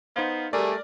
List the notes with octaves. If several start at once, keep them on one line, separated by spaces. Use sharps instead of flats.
B3 D#4 C5 F5
G3 A3 G#4 A#4 D5